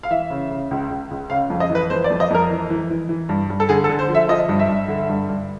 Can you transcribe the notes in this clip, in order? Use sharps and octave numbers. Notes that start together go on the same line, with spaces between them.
F5
E3 E5
C#3
C#3
C#2
C#2
C#2
C#3 F5
F2
D#5
E3
B4
F2 C5
D5
F2
D#5
F2 A#4
E3
E3
E3
E3
G2
G2
A4
D3 G#4
A4
D3
C5
F3
E5
F3 D#5
G2
E5
G2
D3
G2
G2